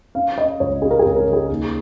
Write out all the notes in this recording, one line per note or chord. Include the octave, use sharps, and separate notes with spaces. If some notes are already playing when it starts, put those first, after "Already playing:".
C#4 F5
C#4 D#5
C#2 C#5
C#4 G#4
A#4
G#4
C#2
A#4
C#3
G#4
D#2